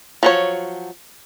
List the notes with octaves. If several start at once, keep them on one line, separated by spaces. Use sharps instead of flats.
F3 F#3 C#5